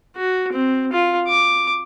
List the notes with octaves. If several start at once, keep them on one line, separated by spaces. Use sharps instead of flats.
F#4
C4
F4
D6